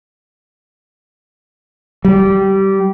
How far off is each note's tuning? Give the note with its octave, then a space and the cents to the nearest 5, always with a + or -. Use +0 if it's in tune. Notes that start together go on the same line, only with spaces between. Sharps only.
G3 -20